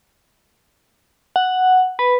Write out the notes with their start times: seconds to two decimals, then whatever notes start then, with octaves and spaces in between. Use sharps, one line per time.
1.36 F#5
1.99 B4